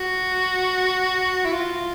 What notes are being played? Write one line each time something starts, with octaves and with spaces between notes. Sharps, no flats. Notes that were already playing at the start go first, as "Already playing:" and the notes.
Already playing: F#4
E4
F4